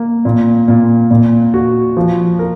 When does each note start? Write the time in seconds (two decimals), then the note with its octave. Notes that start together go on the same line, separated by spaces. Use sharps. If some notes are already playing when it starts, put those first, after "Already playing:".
Already playing: A#3
0.25 A#2
0.68 A#2
1.11 A#2
1.54 F#4
1.97 F3
2.39 A#4